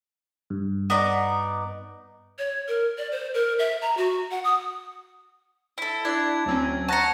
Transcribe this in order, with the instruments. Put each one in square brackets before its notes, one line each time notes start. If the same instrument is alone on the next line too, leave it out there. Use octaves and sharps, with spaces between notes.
[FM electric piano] G2
[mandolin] B3 D#4 D5
[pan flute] C#5
A#4
D5
C5
A#4
E5
A#5
F#4
F#5
D#6
[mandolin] E4 A4
[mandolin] D4 [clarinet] E4 [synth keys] F#6 A6 [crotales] G#6
[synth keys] D2 C4 C#4 [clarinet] F#3
[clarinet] F#5 [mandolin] A5 A#5 [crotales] C#6 A#6 C#7